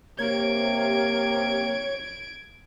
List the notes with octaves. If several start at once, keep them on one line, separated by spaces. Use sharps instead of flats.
C3 A#3 G4 C#5 G#6 D7